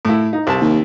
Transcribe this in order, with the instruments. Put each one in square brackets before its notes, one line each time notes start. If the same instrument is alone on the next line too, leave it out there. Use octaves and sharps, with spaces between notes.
[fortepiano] A2 E4
D#4
C2 A5
[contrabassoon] D#2